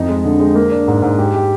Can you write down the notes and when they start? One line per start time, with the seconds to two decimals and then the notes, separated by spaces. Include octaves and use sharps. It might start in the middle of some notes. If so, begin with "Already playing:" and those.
Already playing: F2 D#4
0.09 G#3
0.25 D3
0.40 G#3
0.55 A#3
0.71 D4
0.88 G#2
1.02 G#2
1.18 G4
1.34 G4